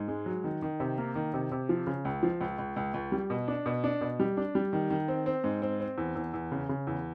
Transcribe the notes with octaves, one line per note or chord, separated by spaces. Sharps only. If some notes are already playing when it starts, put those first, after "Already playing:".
Already playing: G#2
G#3
F#3
D#3
D#3
C3
A#3
D#3
C3
C3
F3
C#3
C#2
F3
C#2
C#2
C#2
C#2
G3
B2
D4
B2
D4
B2
G3
D4
G3
D#3
D#3
C4
C4
G#2
C4
C4
E2
E2
E2
C#3
C#3
E2